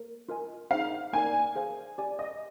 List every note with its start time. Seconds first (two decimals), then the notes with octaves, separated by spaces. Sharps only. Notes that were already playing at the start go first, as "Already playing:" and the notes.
Already playing: A#3 A#4
0.29 F4 A#4 D#5 G#5
0.71 D#4 G#4 C5 F5
1.13 A#3 D#4 A#4 D5 G#5
1.56 G#4 C5 F5 G#5
1.98 G4 D5 G#5
2.19 D#5